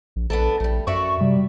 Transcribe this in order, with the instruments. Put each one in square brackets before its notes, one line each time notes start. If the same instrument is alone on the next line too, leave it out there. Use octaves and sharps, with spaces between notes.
[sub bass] A#1
[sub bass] A#1 [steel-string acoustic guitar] B3 D4 A4
[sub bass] A#1 [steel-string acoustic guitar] G3 A3
[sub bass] F#2 [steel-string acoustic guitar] F#4 D5 E5 [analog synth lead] C#6
[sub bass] C3 [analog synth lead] G3